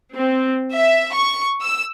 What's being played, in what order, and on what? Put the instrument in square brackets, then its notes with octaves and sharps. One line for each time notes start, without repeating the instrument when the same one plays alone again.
[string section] C4
E5
C#6
E6